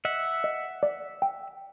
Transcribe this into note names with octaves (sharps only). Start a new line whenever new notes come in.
D#5 E5 F#5
D#5
D5
G5